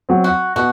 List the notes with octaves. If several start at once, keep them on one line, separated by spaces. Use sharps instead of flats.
F#3 C4
F#4
B2 F#4